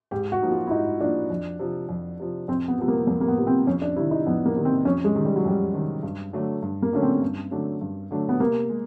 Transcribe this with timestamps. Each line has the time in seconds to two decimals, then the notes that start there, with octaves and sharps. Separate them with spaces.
0.11 G#2 G4
0.32 F#4
0.42 F3 A#3 D#4
0.51 F4
0.67 E4
0.71 G#2 D#4
1.01 F3 A#3 D4 D#4
1.30 F2
1.59 C3 F3
1.89 F2
2.19 C3 F3
2.48 F2 C4
2.68 B3
2.78 C3 F3 B3
2.88 A#3
3.07 F2 A#3
3.21 A#3
3.28 B3
3.38 C3 F3
3.47 C4
3.67 F2 C#4
3.82 D4
3.96 C3 E4
3.99 D#3
4.11 D#4
4.26 F2 B3
4.46 A#3
4.56 C3 D#3
4.65 C4
4.85 F2 C#4
5.04 G#3
5.15 C3 D#3
5.25 G3
5.36 F#3
5.45 F2 G3
5.74 C3 D#3
6.03 G2
6.33 D3 F#3 A3 D4
6.62 G2
6.82 A#3
6.93 D3 F#3 A3 C#4 D4
7.02 C4
7.22 G2
7.51 D3 F#3 A3 D4
7.81 G2
8.11 D3 F#3 A3 D4
8.29 B3
8.40 C3 A#3
8.69 G#3